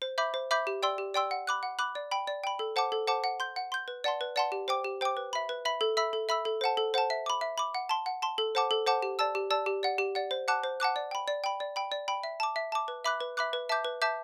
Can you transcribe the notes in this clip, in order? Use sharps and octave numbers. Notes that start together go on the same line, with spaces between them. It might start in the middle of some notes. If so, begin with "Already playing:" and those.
C5
E5 B5 D6 G6
C5
E5 B5 D6 G6
G4
D5 G5 C6 E6
G4
D5 G5 C6 E6
F#5
B5 D6 F#6
F#5
B5 D6 F#6
D5
G5 B5
D5
G5 B5
A4
C5 F#5 A5 D6
A4
C5 F#5 A5 D6
F#5
C6 G6
F#5
C6 G6
B4
D5 F#5 A5 C6
B4
D5 F#5 A5 C6
G4
C5 G5 D6
G4
C5 G5 D6
B4
E5 B5
B4
E5 B5
A4
E5 B5 E6
A4
E5 B5 E6
A4
C5 F#5 A5
A4
C5 F#5 A5
E5
B5 D6
E5
B5 D6
F#5
A5 C6
F#5
A5 C6
A4
C5 F#5 A5 D6
A4
C5 F#5 A5 D6
G4
D5 A5 E6
G4
D5 A5 E6
G4
D5 F#5
G4
D5 F#5
C5
F#5 A5 D6 F#6
C5
F#5 A5 D6 F#6
D5
G5 B5
D5
G5 B5
D5
G5 B5
D5
G5 B5
E5
A5 D6
E5
A5 D6
B4
E5 B5 D6 F#6
B4
E5 B5 D6 F#6
B4
E5 A5 D6 G6
B4
E5 A5 D6 G6